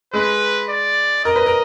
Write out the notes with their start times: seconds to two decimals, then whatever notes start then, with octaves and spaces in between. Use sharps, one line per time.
0.13 G#3 B4
0.69 D5
1.25 A#4 D#5
1.36 B4
1.46 A#4